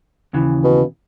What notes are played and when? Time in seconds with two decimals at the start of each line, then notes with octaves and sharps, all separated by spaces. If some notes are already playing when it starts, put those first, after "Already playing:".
0.33 D#2 C#3 E3
0.64 B2